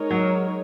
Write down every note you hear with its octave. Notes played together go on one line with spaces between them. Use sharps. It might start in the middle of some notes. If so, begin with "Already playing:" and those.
Already playing: G#3 D#4 A#4 C#5
F#3